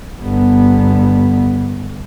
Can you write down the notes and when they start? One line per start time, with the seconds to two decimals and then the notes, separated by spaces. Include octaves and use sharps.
0.22 G1 B3